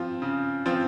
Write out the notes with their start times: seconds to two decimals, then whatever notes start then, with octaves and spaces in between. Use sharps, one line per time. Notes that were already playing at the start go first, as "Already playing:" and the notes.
Already playing: F3 C4 F4
0.22 C#3
0.66 F3 C4 F4